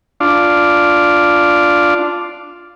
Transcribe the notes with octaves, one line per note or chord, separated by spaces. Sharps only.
D4 F4